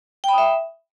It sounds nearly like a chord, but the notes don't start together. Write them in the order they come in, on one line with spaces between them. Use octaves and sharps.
G5 B5 D#6 E5